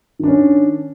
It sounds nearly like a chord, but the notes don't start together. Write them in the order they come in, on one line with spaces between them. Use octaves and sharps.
D#3 D4 C#4